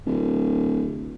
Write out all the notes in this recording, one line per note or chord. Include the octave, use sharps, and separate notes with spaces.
D1